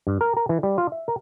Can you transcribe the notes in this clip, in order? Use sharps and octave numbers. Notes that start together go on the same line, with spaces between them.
G2
A#4
A#4
E3
G3
F4
E5
A#4